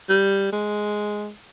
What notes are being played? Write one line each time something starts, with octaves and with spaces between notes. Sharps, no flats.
G3
G#3